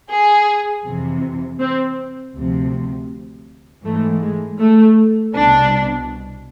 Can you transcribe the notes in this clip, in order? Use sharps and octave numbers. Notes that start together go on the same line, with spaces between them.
G#4
F2 C3 E3
C4
D2 C3 F3
G#2 E3 A3
G#3
A3
C2 B2 D4